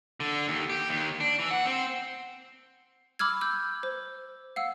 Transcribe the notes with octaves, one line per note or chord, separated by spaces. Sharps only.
D3
D#2
G4
D#2
D4
E3
F#5
C4
B5 D6 E6 F6 G#6
E6 G6
C5
F5 F#5 E6